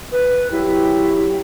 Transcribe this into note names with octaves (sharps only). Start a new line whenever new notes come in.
B4
F#3 E4 G4